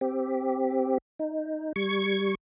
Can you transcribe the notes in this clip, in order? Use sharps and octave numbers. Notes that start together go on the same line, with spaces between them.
C4 G4
D#4
G3 C#6 G#6